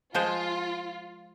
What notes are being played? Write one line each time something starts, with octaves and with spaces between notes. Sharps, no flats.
F3 G#3 F4 C5